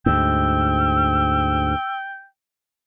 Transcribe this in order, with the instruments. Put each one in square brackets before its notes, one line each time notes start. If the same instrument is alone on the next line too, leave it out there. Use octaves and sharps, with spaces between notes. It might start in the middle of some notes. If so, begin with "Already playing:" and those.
[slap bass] D2 G#2 [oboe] G5 [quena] E6